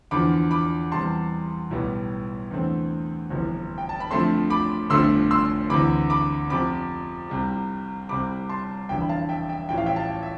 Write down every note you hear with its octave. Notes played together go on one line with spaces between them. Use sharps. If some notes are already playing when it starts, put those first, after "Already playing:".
E2 D3 F3 B5 D6
B5 D6
E2 C3 G3 A5 C6
B1 A2 G3 B3
E2 D3 A3 C4
G1 F2 C3 E3
G5
A5
B5
F2 D3 F3 A3 C4 A5 C6
B5 D6
G1 F2 D3 F3 A3 C6 E6
C6 E6
D2 C3 E3 B5 D6
B5 D6
F2 C3 F3 B5 D6
C2 C3 G3
C2 C3 G3 B5 D6
A5 C6
F1 E2 D3 E5 G5
B5
F5 A5
E5 G5
E5 G5
A1 A2 F3 G5
F5
E5 G5
F5 A5
E5